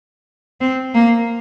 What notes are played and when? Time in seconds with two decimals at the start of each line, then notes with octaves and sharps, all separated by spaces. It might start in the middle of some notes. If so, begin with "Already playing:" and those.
0.61 C4
0.94 A#3